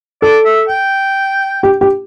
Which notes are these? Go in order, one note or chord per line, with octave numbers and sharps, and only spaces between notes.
A4 D5
E5
G5
G4
G4